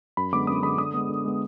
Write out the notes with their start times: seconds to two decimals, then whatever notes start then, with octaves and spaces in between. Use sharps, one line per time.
0.17 F#2 B5
0.32 D3 G#3 B3 D6
0.47 F#2 D#6
0.63 D3 G#3 B3 B5
0.78 D3 D#6
0.94 G#3 B3
1.09 D3
1.25 G#3 B3